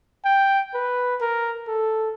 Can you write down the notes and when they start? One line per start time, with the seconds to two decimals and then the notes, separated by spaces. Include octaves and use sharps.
0.25 G5
0.74 B4
1.21 A#4
1.68 A4